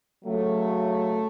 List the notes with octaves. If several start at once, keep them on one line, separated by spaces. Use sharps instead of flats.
C#3 F#3 A3